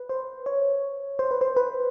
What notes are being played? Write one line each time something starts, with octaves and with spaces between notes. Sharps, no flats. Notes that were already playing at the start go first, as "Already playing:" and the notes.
Already playing: B4
C5
C#5
C5
B4
C5
B4